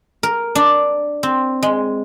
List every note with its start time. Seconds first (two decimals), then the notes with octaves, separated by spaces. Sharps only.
0.23 A#4
0.55 D4
1.23 C4
1.63 G#3